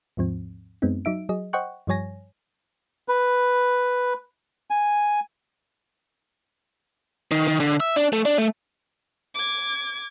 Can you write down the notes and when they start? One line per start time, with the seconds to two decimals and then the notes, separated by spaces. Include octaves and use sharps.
0.17 D#2 G#2 F3 C4
0.82 F#2 G#3 B3 C4 D#4
1.05 F#3 D#4 E5 D7
1.29 F#3 G#4 D#5
1.53 C5 D#5 F#5 G5 C#6 F#6
1.87 G2 F3 G3 C#5 G#5 A#6
3.08 B4
4.70 G#5
7.31 D#3
7.48 D#3
7.60 D3
7.80 E5
7.96 D4
8.13 A3
8.25 D4
8.38 A3
9.35 D6 G#6